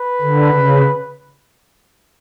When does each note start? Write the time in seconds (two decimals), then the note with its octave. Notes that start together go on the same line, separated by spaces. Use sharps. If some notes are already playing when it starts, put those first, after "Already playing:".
Already playing: B4
0.21 D3
0.53 C#3